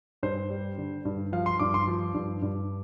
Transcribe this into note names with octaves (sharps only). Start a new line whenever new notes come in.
G2 C5
G3
D3
G2
F3 F5
C6
G2 D6
C6
F3
G2
G2